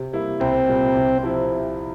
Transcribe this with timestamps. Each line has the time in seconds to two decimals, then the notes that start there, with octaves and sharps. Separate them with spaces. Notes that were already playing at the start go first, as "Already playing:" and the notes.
Already playing: C3
0.13 G3 A#3 E4
0.40 C2 C4
0.68 A#2 G3
0.95 C2
1.23 C3 F3 C4 E4